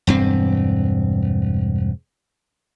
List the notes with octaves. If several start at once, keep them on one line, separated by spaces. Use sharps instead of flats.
E1 G2 C4